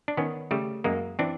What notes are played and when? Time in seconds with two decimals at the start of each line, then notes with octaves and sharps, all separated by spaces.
0.08 D4
0.17 D#3 B3 C#4
0.51 C#3 G3 A3
0.84 F#2 G#3 A#3
1.19 E3 C4 D4